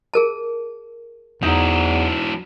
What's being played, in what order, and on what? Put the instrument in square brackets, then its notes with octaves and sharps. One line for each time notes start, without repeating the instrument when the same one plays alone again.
[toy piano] G#4 A#4 A5
[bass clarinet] E2 [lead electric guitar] F#3 E4 [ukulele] D#4 A#5